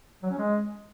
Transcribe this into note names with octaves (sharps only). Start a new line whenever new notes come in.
F#3
C#4
G#3